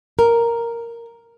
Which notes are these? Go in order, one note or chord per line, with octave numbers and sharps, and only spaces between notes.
A#4